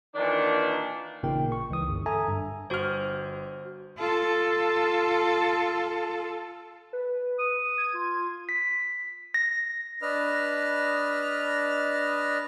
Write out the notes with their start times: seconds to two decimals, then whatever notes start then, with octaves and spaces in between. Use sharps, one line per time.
0.15 A#2 D#3 E3 D4
1.23 A1 A#2 C#3 D#4 A#4 G5
1.52 C#6
1.70 C#2 E3 D#6
1.88 G1
2.06 A4 E5 G#5 A#5 D#6
2.28 G2
2.70 G1 F#4 C5 F6
3.98 F4 A4
6.93 B4
7.39 D#6
7.78 G#6
7.94 F4
8.49 B6
9.34 A#6
10.02 D4 B4 D#5 F6